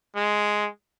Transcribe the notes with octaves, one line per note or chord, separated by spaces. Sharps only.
G#3